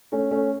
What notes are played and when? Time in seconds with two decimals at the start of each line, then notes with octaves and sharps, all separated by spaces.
0.12 A3 C#4
0.31 A3 C#4